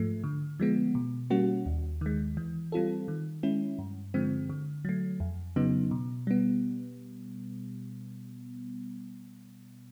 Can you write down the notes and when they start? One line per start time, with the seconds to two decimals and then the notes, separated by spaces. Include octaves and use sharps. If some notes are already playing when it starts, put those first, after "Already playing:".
Already playing: G#2 F3 A3
0.24 D3
0.60 F3 G#3 B3
0.95 B2
1.30 G3 A#3 C#4 F#4
1.66 D#2
2.01 D#3 G#3
2.37 E3
2.72 G3 C4 F4 A4
3.08 D#3
3.43 G#3 C#4 E4
3.79 G2
4.14 D3 F3 G#3 C4
4.50 D3
4.85 F#3 A3
5.20 F2
5.56 C#3 F#3 B3 D#4
5.91 B2
6.27 G3 B3